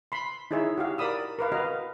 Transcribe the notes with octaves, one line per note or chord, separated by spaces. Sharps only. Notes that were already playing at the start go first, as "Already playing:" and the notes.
B5 C6
D#4 E4 G#4 C#5 E5
F#4 G4 F5
A#4 D5 B5 D#6 E6
A#4 B4 F5
F#4 B4 D#5 F5 A#5